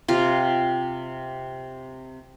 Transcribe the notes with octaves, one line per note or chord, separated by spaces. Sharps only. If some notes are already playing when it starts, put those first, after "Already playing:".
C3 F4